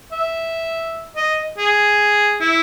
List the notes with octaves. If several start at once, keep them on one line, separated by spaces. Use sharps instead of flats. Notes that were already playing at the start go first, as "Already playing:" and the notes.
E5
D#5
G#4
E4